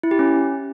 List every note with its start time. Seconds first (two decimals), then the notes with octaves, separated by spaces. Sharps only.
0.03 E4
0.11 G4
0.19 C#4